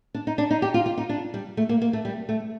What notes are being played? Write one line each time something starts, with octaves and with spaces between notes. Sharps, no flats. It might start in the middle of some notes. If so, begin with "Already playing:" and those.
D4
D#4
D4
D#4
G4
F4
F4
D#4
D4
G3
A3
A#3
A#3
A3
G3
A3